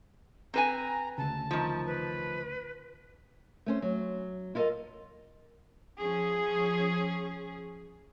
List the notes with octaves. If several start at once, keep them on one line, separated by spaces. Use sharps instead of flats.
C4 B4 G#5 A#5
D2 C#3 A5
D#3 F3
B4
A3 C#4 C5
F#3
E4 F4 A4 A#4 D#5
F3 C#4 G#4